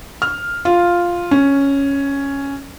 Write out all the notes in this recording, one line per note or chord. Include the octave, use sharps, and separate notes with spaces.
F6
F4
C#4